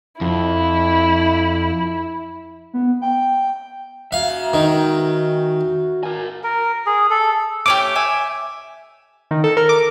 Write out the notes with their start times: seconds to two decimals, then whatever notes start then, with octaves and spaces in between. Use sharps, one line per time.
0.21 F2 E4
2.74 B3
3.02 G5
4.12 F#4 E5 F5
4.54 D#3
6.03 A#4 G#5
6.44 A#4
6.86 G#4
7.10 A4
7.66 A3 C#4 G4 D6
7.95 E5 G#5
9.31 D#3
9.44 A4
9.57 A#4
9.69 D6